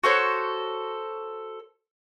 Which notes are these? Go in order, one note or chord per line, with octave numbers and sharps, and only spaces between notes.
F#4 A4 C5 C#5